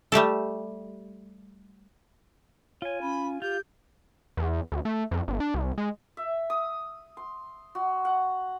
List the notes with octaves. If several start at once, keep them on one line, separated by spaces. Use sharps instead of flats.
G3 A3 G4 A4
F4 C#5 G#5
C#4 B5
F4 G4 G6
E2
D2
A3
F2
G1
D4
C2
G#3
E5
D#6
C6
F#4
F#5